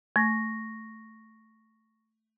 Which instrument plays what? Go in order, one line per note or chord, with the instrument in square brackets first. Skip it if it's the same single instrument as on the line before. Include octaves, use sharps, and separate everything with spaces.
[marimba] A3 [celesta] C#6 A#6